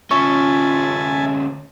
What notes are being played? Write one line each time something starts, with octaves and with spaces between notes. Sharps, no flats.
D2 C#4 F4 E5 G#5 A5 C#6